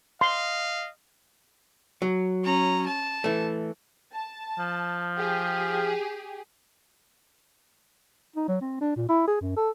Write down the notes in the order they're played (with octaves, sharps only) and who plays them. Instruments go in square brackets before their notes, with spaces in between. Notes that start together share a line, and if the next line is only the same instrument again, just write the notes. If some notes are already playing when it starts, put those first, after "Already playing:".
[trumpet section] D#5 F5 [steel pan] C6
[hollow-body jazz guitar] F#3
[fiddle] C#4 A#5
A5
[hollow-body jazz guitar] E3 A3
[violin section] A5
[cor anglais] F3
[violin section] G4 G#4
[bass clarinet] D#4
F#3
C4
D4
A#2
E4
G#4
F#2
A4